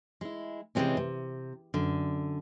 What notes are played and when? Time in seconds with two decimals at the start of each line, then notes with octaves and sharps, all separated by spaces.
0.21 G#3 E4
0.75 C3 E3 F#3 G#3 C4 C#4
0.97 C3
1.74 F#2 D3